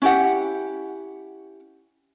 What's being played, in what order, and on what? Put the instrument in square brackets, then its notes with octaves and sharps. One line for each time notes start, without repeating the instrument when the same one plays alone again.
[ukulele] C#4 E4 G4 F#5